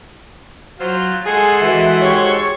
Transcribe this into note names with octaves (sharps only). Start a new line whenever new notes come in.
F#3 F4 C5
G#3 G#4 A4 F#5 G#5 C6
E3 G#3 F#4 E5
G#2 G4 C5 C#5 C#6